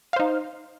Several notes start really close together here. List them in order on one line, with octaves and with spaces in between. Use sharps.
F5 C5 D#4